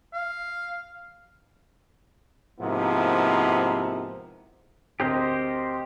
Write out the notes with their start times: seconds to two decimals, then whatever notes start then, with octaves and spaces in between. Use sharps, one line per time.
0.13 F5
2.60 G#2 C3 F3 A#3 B3 E4
5.00 D2 C4 G4 A#4 C5 D#5